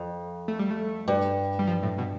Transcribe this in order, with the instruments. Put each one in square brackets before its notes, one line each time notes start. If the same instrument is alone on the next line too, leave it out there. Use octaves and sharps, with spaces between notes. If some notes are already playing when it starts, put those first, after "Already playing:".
Already playing: [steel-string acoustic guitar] F2
[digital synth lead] A3
G3
A3
[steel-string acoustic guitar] G2
[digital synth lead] G3
F3
A2
B2